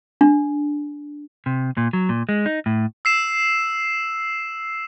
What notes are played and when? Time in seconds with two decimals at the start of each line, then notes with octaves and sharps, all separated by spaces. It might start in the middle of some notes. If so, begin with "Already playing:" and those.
0.21 D4
1.46 C3
1.77 A#2
1.93 F#3
2.09 A#2
2.29 G#3
2.46 D#4
2.66 A2
3.05 E6 C7 E7